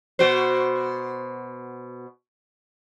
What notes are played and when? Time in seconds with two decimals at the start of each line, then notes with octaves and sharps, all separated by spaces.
0.19 B2 F#4 C5